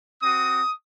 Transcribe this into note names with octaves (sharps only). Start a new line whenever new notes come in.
C4 F#4 D#6